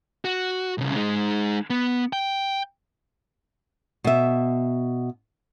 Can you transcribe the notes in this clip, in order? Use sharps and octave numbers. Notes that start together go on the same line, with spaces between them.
F#4
C2 C#3
G#3 D#4
B3
G5
B2 E5